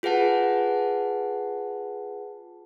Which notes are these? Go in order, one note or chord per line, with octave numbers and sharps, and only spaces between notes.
F4 G#4 B4 F#5 A5